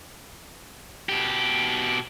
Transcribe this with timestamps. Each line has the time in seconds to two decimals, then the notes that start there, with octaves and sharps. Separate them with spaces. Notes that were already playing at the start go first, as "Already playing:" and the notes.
1.09 B2 G4